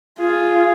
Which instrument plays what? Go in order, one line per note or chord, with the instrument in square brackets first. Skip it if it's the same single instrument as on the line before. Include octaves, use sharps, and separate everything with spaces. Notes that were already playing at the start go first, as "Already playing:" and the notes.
[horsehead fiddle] F4 [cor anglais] G#4